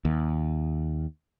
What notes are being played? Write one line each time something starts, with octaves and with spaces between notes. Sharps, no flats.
D#2